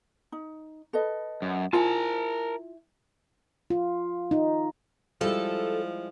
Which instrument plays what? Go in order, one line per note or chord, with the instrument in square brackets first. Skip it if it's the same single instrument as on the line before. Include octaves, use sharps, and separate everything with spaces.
[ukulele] D#4
A4 B4 D#5
[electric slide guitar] F#2
[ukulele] E4 G#5 [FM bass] F4 [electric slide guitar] A#4 A5
[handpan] F4
D#4
[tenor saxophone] F3 [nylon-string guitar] G3 G#3 E4 [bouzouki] A4